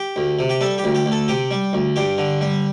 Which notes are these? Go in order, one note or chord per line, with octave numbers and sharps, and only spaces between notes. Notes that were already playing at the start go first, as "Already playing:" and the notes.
Already playing: G4
D2
C3
G4
G3 A4
G4
D2
G4
D2
A4
C3 G4
G3
D2
G2 G4
D3
G3